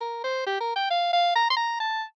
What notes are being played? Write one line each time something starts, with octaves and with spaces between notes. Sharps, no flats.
A#4
C5
G4
A#4
G5
F5
F5
A#5
C6
A#5
A5